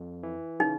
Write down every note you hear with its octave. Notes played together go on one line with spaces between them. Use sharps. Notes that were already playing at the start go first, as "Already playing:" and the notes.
Already playing: F2
E3
C#3 D#4